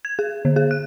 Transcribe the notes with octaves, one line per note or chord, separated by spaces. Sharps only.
G#6
G#4
D3
G#4
F#6